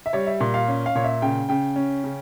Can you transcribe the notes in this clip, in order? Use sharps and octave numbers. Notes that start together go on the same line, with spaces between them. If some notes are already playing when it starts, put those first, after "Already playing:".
E5
G3 C#5
E5
A#2
F5
C#4
F5
A#2 C#5
E5
C#3 G5
C#3 G5
C#4
C#3